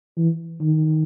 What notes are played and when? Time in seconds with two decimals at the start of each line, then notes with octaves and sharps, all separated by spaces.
0.18 E3
0.61 D#3